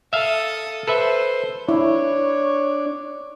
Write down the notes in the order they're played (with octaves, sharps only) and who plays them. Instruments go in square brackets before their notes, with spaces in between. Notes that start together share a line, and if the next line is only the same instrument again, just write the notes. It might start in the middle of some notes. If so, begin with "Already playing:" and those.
[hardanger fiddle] A4 D#6 [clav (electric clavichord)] E5 F5
[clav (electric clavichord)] A4 B4 E5 [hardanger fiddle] C5
[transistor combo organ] D4 D5 [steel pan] E4 [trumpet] C#5